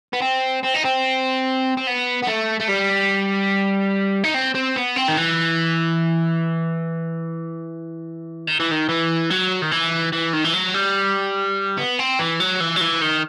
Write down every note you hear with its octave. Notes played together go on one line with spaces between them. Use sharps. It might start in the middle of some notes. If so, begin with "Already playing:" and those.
B3
C4
C4
D#4
C4
C4
B3
B3
A3
A3
G3
D#4
C4
C4
B3
C4
D#3
E3
D#3
E3
D#3
E3
F#3
D#3
E3
E3
D#3
E3
F#3
G3
B3
C4
E3
F#3
E3
F#3
E3
D#3